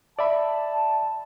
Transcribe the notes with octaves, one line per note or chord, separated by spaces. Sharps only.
D5 E5 A5 B5